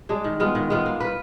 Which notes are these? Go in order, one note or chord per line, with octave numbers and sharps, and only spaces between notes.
G#3 D4 G#4
D#3
G#3 B3 F4
D#3
G#3 B3 F4
A#3
F4 B4